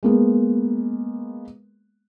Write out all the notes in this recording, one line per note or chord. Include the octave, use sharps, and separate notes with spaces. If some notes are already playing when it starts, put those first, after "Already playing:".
G#3 A#3 B3